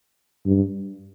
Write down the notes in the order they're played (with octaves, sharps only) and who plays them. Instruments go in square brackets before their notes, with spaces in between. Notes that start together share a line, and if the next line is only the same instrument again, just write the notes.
[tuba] G2